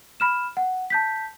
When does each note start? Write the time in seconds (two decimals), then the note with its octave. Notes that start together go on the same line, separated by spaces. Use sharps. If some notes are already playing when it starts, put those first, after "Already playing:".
0.20 B5 F6 E7
0.57 F#5
0.90 A5 G6 B6